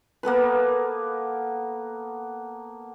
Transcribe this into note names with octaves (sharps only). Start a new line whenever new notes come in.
A#3 B3 A4 B4